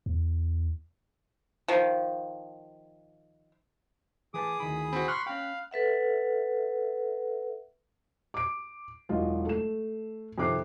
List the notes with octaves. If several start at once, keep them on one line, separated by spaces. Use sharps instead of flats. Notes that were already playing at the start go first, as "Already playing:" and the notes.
E2
D#3 F3
E3 G#4 B4 A5 D6 D#6
D2 D#3 E3 B5
C4 F#4 B5
C6 C#6 F6 F#6
C#4 F5 G5
A4 B4 E5 F#5
D6 D7
E1 F#3 D#4 F4 D#5
A3 A4 E7
F2 C3 D#3 D6 F#6 C7